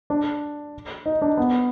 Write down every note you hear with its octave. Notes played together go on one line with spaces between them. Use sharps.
D4
D#4
D4
B3